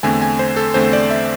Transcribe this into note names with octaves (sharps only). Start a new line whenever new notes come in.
E2 D3 A3 C4 G#5
G#5
C5
A4
E2 D3 A3 C4 C5
D5
E5